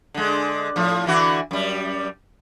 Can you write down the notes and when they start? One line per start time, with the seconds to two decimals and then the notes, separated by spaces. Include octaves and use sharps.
0.14 D3 G#3
0.76 A2 F3
1.06 D3 E3 F#4
1.51 F#2 G3